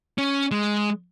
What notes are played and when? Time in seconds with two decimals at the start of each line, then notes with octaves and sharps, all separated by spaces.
0.18 C#4
0.51 G#3